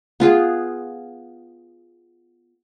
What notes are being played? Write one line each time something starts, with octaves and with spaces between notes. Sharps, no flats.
B3 F4 G#4